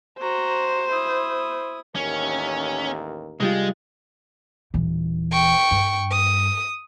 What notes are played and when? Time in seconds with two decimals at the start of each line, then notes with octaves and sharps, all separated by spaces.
0.20 F#4 C5 A#5
0.89 E4 D#6
1.95 A1 D#2 C#4 A#4
3.40 C2 G3 G#3 F4
4.74 D#1 E3
5.32 G5 C#6
5.71 G2
6.11 D#6